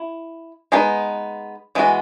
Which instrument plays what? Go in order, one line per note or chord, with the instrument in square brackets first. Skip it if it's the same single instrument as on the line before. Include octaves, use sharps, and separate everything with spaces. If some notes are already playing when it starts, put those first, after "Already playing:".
Already playing: [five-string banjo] E4
G#3 B3 D#4 F#4 B4
E3 G#3 B3 F#4